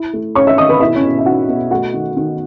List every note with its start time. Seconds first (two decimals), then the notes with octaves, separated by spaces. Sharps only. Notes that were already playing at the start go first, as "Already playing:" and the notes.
Already playing: E4
0.13 A3
0.35 C#4 C#5 C#6
0.47 E5 E6
0.58 D#3 D#5 D#6
0.69 B4 B5
0.80 B2 E4 E5
0.95 C#4 C#5
1.03 B2
1.19 E5
1.26 D#4 F#4 F#5
1.48 B2
1.71 A3 F#4 F#5
1.94 D#3
2.17 D#3